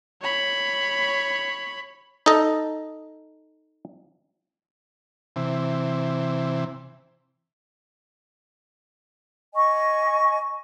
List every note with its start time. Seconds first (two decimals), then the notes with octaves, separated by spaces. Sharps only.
0.22 C#5 B5
2.26 D#4 A4 D#5
5.36 C3 E3
9.53 D#5 G#5 C#6